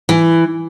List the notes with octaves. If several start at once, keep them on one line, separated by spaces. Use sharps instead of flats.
E3